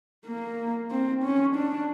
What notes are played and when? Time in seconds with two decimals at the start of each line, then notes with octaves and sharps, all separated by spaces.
0.27 A#3
0.91 C4
1.23 C#4
1.55 D4